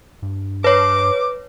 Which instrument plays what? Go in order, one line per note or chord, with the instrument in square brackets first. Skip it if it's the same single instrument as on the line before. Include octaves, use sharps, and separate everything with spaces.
[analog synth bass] G2
[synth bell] B4 C#5 [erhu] D6